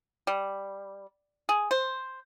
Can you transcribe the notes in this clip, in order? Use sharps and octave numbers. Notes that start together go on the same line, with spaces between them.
G3
G#4
C5